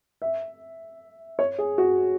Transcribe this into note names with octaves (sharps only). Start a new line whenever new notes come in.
E5
C#5
G#4
F#4